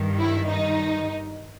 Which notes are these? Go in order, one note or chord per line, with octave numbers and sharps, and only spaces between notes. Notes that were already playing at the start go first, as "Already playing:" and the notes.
Already playing: G2 D#3
E4
D#4